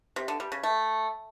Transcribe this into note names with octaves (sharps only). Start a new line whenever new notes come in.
C3
D3
G3
C#3
A3